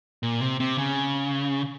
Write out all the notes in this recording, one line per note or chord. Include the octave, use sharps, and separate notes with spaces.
A#2
C3
C3
C#3